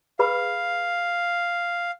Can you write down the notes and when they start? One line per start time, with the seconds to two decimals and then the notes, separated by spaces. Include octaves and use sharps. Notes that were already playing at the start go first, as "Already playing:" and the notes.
0.19 G#4 B4 F5 B5